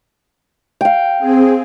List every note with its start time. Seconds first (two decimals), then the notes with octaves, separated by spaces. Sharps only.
0.81 F5 G5
1.19 C4 G#4